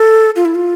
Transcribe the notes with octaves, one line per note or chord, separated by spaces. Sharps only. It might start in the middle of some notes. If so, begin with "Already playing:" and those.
Already playing: A4
F4
E4
F4